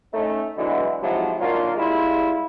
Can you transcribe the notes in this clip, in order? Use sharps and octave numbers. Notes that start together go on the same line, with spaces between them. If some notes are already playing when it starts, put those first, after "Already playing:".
A3 C#4 D#4
B2 D3 E3 F#3 G#3 E4
G#2 C3 F3 F#3 G#3 E4
D#3 F#3 A#3 D4 F4
G3 G#3 E4 F4